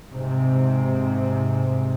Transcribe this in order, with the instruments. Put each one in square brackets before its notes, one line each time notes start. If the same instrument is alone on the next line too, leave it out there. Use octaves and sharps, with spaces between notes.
[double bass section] G#2 C3